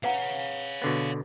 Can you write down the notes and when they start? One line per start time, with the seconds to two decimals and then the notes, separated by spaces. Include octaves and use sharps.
0.04 B4 C#5 F5 F#5 A#5
0.82 B2 D3 B3